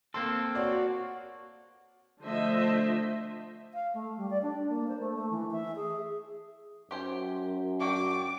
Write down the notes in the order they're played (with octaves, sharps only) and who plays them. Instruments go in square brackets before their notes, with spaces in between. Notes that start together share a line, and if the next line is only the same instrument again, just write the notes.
[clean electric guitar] A#3 C4 A4 [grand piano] C6
[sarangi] F#4 [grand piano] C#5 D5
[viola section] D3 F3 A3 C5 D#5 E5
[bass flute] F5
A3
G3
D5
D4
A#3
C5
A3
A3
E3
E5
G#4
[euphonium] F#2 [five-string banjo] G4 C5 G#5
[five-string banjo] D4 F#4 G5 [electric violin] D6